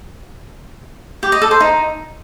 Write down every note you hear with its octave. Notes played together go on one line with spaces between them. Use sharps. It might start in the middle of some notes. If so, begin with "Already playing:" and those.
G4
D#5
A4
C5
D#4